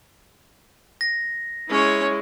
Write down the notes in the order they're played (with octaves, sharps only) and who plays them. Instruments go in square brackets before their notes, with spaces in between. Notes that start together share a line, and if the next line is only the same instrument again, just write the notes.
[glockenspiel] A#6
[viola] G#3 E4 [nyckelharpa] C#4 C#5